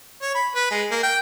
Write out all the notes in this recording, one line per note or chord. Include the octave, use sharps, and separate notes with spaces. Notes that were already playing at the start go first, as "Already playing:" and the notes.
C#5
B5
B4
G#3
A#3
G5